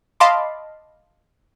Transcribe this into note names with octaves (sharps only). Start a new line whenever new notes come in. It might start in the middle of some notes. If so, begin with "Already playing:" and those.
D#5 F5 A5 B5 C6 D6